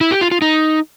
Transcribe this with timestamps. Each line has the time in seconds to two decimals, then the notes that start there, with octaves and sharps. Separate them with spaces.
0.01 E4
0.11 G4
0.21 F4
0.31 F4
0.42 D#4